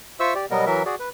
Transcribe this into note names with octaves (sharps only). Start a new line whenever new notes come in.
F4 C5 E5 C#6 E6
G4 D5
B2 F#3 G3 B3 A#4 D#5
E3 F#3 A#4 E5
F#4 G#4 D5
B4